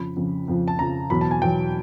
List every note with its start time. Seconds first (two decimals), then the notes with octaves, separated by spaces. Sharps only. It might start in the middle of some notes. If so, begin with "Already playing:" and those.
Already playing: F2 C#3 F3 B5
0.16 F2 C#3 F3
0.48 F2 C#3 F3
0.68 A5
0.79 F2 C#3 F3 A#5
1.10 E2 B2 F#3 B5
1.21 A5
1.31 G#5
1.42 E2 B2 F#3 G5